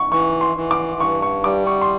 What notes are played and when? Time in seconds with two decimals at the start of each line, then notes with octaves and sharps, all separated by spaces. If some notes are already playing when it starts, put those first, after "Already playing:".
Already playing: C#6
0.12 E3 C#6
0.41 C6
0.57 E3
0.71 D6
1.00 G2 C#6
1.22 C#6
1.44 G3 D6
1.67 C#6
1.82 C6